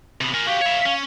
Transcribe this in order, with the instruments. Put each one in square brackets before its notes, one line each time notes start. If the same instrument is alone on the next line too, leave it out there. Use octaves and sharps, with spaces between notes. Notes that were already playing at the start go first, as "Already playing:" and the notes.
[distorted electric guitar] C3 B3
A#4 G#5
[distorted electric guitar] F#4 G4 [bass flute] F5
[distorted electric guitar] C#5 E5
C#4